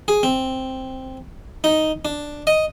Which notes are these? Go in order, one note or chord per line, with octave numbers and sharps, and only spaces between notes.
G#4
C4
D#4
D4
D#5